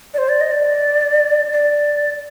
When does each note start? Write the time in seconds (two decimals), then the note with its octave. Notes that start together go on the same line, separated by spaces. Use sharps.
0.14 D5
0.18 C5
0.29 D5
0.41 D#5
0.51 D5
1.52 D5